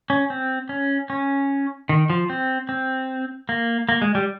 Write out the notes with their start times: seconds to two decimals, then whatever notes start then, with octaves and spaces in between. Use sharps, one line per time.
0.10 C#4
0.30 C4
0.69 C#4
1.10 C#4
1.89 D#3
2.10 F3
2.30 C4
2.69 C4
3.49 A#3
3.89 A#3
4.02 G#3
4.15 G3